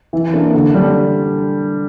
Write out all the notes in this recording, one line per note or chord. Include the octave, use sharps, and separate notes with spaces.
E3
A#3 D4
D3
G3 D4